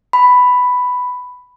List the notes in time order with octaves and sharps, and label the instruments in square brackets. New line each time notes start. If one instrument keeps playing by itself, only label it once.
[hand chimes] B5